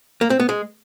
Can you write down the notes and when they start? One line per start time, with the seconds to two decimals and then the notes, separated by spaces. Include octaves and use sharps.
0.21 A#3
0.30 C4
0.40 B3
0.49 G#3